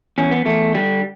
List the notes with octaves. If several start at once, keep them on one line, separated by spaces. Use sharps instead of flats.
E2 C#4
B3
E2 A3
D3 G3